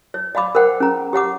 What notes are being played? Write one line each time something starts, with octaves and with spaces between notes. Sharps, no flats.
C#5
D5 F5 B5 D6
A#4 C5 F#5 G5
C#4 G#4 A#5
G4 C#5 F#5 D6